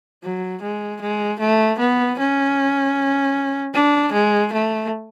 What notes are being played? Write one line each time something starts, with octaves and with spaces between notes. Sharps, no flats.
F#3
G#3
G#3
A3
B3
C#4
D4
G#3
A3